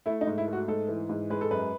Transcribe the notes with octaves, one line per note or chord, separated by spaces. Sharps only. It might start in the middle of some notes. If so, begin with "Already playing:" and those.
A3 E4
D#4
G#2
E4
A3 F#4
G#2 A4
E3
G#2
G#3 B4
A4
F#2 B4